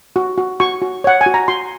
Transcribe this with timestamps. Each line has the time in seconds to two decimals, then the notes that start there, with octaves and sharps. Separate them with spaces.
0.16 F#4
0.38 F#4
0.60 F#4 C#6
0.82 F#4
1.04 C#5 F#5
1.21 G#5
1.26 F#4
1.34 A#5
1.48 F#4 C6